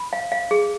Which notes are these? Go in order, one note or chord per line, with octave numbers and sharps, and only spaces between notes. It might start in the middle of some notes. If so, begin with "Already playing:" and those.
Already playing: B5
F5
F5
G#4